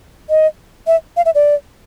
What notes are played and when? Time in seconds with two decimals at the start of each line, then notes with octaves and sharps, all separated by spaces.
0.29 D#5
0.87 E5
1.17 F5
1.25 E5
1.35 D5